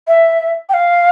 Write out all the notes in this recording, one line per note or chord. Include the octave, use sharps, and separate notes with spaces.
E5
G5
F5